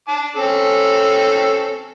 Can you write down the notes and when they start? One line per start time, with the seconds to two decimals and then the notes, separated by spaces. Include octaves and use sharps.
0.08 A5 D6
0.36 C4 C#4 A4